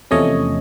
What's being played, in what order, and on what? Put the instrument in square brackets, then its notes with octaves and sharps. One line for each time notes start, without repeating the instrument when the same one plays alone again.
[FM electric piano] E2 C3 F3 A3 C#4 C#5 D#5